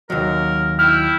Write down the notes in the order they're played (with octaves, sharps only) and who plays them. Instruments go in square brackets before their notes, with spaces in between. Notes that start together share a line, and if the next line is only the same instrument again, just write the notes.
[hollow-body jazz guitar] D#2 F#3 [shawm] A#4
[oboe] E4 [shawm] G5 [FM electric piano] F6